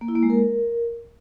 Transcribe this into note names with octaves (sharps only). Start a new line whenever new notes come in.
A#3
E4
A#3
G#3
A#4